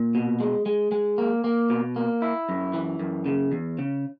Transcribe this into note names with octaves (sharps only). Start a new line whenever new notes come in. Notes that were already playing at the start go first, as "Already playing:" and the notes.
Already playing: A#2
B2
G#3
G#3
G#3
A#3
A#3
B2
A#3
E4
F#2
E3
F#2
C#3
E2
C#3